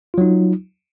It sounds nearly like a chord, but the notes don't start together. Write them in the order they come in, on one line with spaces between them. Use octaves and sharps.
F4 F#3 D#4